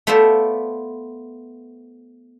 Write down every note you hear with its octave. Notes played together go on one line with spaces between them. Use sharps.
A3 B3 F4 C5 D5 E5